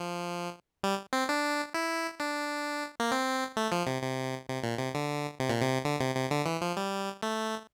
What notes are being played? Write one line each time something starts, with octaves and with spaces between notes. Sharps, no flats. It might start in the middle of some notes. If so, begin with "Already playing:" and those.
Already playing: F3
G3
C4
D4
E4
D4
A#3
C4
A3
F3
C3
C3
C3
A#2
C3
D3
C3
A#2
C3
D3
C3
C3
D3
E3
F3
G3
A3